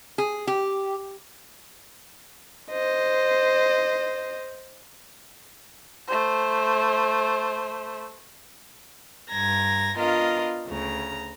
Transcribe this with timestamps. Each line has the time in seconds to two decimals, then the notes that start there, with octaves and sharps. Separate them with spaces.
0.18 G#4
0.47 G4
2.71 C5 D#5
6.08 A3 C5
9.28 G2 A#5 G#6 A#6
9.97 B3 D4 F4 A#4 D#5 F5
10.66 D2 C#3 A#5